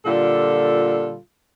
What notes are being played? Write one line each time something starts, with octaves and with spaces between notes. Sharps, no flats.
A#2 D3 G3 F4 A4